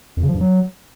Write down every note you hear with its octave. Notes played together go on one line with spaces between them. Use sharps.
F2
C#3
F3
G2
F#3